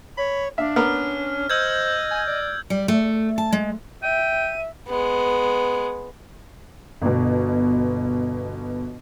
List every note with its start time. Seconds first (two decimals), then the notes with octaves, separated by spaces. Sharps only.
0.18 C#5 B5
0.58 D4 E5 F5
0.76 B3 C#4 A#4 F6
1.50 C5 D#5 E6 G6 G#6
2.11 G#5
2.28 D5
2.70 G3
2.88 A3
3.38 A5
3.52 G#3
4.03 E5 G5 D#7
4.87 G#3 B3
7.02 G1 B2